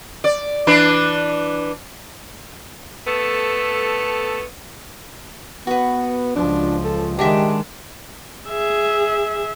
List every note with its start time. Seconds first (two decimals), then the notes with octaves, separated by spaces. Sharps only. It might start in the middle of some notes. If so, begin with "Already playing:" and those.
0.24 D5
0.67 E3 D4 B4
3.07 A3 B3 A4
5.67 B3 F#4 B4
6.35 C#2 F3 D4
6.84 A4
7.19 D#3 G#3 D4 G4 D#5 E5
8.50 G#4 E5